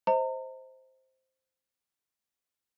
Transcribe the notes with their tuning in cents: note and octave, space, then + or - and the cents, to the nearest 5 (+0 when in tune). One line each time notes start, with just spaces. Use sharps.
C5 +0 D#5 +35 A#5 -35